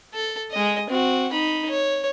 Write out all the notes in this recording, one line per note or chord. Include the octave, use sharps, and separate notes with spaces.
A4
G#3 D#5
C4 F#4
D#4 B5
C#5